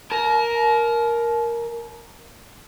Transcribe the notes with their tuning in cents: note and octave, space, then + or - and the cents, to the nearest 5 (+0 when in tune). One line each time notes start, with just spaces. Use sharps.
A#4 +5 A5 -40